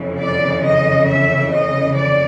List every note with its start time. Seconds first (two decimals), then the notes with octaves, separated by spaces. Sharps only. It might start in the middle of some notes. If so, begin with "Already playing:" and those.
Already playing: F2 C#3 E3
0.19 D5
0.64 D#5
1.08 E5
1.51 D#5
1.96 D5